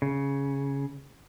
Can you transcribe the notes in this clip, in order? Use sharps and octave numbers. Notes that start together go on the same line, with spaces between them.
C#3